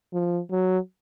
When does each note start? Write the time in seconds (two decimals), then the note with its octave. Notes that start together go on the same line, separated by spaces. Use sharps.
0.13 F3
0.51 F#3